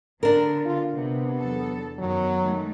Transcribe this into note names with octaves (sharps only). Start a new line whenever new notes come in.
D3 B3 D4 A#4
F4
C3 B3
E2 F#3 A4
F#2 D#3 F#3 B3
D#3 G#3 A3